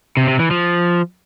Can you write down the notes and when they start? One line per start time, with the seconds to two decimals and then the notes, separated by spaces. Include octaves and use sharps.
0.17 C3
0.28 C3
0.39 E3
0.51 F3